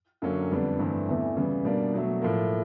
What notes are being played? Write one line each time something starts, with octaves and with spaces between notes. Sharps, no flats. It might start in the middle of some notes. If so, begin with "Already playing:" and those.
F#2 D3 F#3 A#3 C#4
F2 D3 G3 B3 D4
G2 E3 A3 C4
E2 C3 E3 A3
C#3 E3 G3 B3
B2 G3 A#3 D4
B2 F#3 A3
A2 F3 A#3